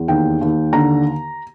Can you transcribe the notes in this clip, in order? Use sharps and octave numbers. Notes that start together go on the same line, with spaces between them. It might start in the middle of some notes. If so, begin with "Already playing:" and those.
Already playing: E2
D#2 G5
D#2
D3 A#5